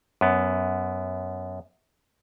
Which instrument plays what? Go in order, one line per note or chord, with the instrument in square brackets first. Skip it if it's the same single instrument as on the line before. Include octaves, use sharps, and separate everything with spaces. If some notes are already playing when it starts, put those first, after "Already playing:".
[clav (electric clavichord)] F#2 B3